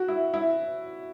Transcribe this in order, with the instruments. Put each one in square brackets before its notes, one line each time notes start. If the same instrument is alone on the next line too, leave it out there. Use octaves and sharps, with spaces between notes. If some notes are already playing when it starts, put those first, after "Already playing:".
Already playing: [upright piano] F#4
E4
E4